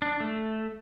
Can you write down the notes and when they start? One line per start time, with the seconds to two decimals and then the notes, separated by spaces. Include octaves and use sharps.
0.02 D4
0.20 A3